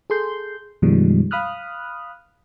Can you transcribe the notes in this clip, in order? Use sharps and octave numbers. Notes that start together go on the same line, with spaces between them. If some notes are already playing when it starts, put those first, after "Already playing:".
G#4 A4 C6 G6
F#2 B2 D#3 F3 G3 G#3
F5 B5 D#6 F6 F#6